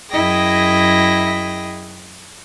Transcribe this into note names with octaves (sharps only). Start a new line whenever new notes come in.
F#2 E4 G#4 D#5 G5 A#6